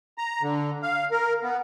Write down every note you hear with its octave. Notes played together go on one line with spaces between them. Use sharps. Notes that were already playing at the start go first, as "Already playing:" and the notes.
A#5
D3
F5
A#4
B3